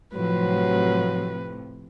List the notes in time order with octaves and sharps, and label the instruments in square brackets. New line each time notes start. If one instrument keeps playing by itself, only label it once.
[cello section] A2 C3 F3 [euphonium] F#3 [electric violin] B4